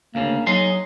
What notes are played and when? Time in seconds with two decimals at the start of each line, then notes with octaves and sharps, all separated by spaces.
0.15 D2 C#3 A#3
0.47 F#3 D#4 G#4 C6